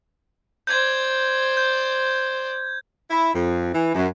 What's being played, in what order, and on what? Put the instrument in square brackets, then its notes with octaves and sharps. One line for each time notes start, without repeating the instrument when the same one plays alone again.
[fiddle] C5 D5 [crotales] G6 G#6
[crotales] G6
[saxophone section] E4
F2
E3
F#2